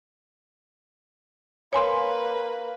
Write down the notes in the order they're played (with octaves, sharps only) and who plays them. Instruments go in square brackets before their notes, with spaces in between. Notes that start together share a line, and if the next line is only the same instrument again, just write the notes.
[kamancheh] A#3 B4 [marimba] C#5 G#5 C6